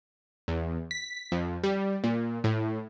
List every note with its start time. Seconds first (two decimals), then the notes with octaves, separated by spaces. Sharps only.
0.48 E2
0.91 B6
1.32 F2
1.64 G3
2.04 A#2
2.44 A2